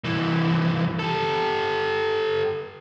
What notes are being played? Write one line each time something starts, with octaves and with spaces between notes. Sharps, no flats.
C2 E3
G4 A4